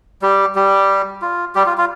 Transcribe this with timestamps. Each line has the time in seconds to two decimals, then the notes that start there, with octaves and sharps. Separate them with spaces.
0.22 G3 G4
0.55 G3 G4
1.22 F4
1.55 G3 G4
1.66 F4
1.78 F4